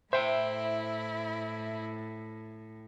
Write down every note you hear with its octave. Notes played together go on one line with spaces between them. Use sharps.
A2 E4 C5 E5 G5